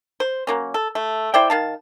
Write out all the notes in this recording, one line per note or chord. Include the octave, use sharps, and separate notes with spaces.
C5
F#3 A#3 C#4
A4
A3
E4 C5 D5 G5
D#3 F5 A5